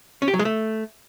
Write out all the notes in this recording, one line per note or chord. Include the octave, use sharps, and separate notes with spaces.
C#4
G4
F#3
G#3
A3